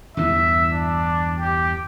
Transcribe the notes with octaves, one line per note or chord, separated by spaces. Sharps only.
E2 G2 E3 E5
D4
G4